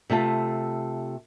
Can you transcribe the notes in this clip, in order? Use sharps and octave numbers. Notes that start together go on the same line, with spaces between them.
C3 A3 F4 A5